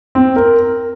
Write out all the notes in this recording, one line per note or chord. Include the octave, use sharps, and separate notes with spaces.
C4
A#4